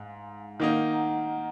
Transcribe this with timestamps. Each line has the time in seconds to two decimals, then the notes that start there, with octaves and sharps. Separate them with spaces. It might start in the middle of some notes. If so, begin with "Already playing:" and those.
Already playing: G#2 F5 G#5
0.60 D#3 A#3 D#4 D#5 F#5
0.93 F#5 A#5